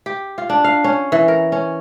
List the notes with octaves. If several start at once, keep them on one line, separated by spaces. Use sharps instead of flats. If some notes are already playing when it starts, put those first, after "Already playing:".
G4
F4
D4
F5
C#4
E3
A#4
C#4